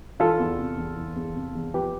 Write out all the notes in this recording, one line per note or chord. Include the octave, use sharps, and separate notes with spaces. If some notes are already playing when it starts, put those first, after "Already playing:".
E3 F4 A4
E2
C3
E2
E3
E2
C3
E2
F3 G4 B4